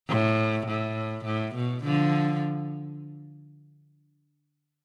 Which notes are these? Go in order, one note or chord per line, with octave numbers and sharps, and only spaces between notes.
A2
A2
A2
B2
D3 F3